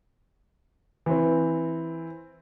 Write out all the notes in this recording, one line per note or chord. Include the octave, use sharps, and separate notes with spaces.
E3 C4